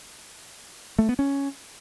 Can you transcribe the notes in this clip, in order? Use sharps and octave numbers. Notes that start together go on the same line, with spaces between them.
A3
B3
C#4